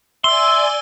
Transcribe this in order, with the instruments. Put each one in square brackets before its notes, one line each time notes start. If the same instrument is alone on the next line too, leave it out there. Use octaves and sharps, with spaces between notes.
[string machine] D5 G#5 [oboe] E5 [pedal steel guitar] C6 [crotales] E6 G7